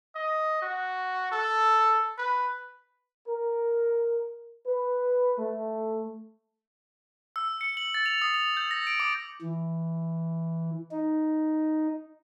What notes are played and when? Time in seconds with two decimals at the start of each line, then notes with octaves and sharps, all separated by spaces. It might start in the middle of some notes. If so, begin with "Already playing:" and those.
0.15 D#5
0.62 F#4
1.32 A4
2.18 B4
3.28 A#4
4.66 B4
5.38 A3
7.36 E6
7.61 C#7
7.77 F#7
7.94 A6
8.06 F7
8.22 D#6
8.34 F7
8.57 G6
8.71 A#6
8.87 D7
9.00 D6
9.42 E3
10.92 D#4